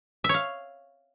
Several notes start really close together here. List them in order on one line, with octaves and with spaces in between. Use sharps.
E5 C#5 F5